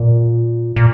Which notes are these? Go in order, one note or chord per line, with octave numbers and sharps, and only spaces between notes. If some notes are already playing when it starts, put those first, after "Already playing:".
Already playing: A#2
A#2